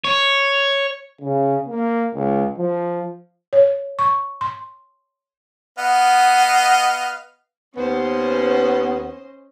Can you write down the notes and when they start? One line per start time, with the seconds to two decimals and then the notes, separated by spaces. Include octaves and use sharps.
0.05 C#5
1.21 C#3
1.68 A#3
2.14 C#2
2.58 F3
3.53 C#5
3.99 C#6
4.41 C6
5.78 B3 D#5 F5 F#5
7.76 D#2 B3 C#4 C5 D#5